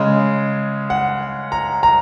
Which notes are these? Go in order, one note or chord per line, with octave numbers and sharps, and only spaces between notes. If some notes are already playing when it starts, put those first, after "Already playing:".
Already playing: C#3 G#3
F#5
A#5
A#5